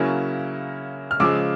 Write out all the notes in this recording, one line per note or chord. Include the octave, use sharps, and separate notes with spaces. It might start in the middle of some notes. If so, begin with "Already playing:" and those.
Already playing: C#3 F#3 A#3 C#4 E4
F6
C#3 F3 G#3 D6 E6